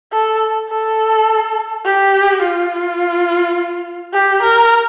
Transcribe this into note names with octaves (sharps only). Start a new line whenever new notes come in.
A4
A4
G4
F4
G4
A#4